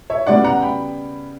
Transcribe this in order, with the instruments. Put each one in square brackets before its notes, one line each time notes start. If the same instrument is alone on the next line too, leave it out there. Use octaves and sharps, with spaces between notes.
[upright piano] C#5 E5
C#3 G3 B3 D5 F#5
F#5 A#5
G5 B5